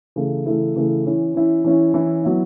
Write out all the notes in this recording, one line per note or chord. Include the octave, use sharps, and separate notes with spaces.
C#3 E3 A3 E4
C#3 E3 A3 E4
C#3 E3 A3 E4
E3 C#4 E4
E3 C#4 E4
E3 C#4 E4
E3 C#4 E4
F#3 B3 E4